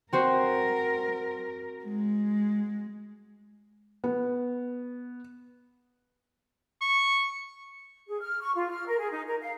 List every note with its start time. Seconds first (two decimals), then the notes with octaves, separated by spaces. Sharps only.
0.13 C4 F#4 A#4 C5
1.85 G#3
4.04 B3
6.81 C#6
8.08 G#4
8.20 F6
8.41 C#6
8.55 F4
8.70 F6
8.87 A#4
8.99 G#4
9.12 D#4
9.27 A#4
9.40 F5